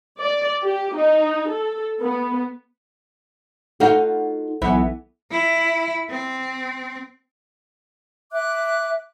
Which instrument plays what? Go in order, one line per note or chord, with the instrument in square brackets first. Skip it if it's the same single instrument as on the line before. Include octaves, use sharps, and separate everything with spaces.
[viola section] D5
G4
D#4
A4
B3
[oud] D#4 F4 F#4 [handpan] A4 F#5
[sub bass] B1 [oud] E3 B3 E5
[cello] E4
C4
[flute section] E5 D6 F#6